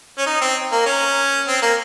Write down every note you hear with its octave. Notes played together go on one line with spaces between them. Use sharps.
C#4
D#4
C4
A#3
C#4
C4
A#3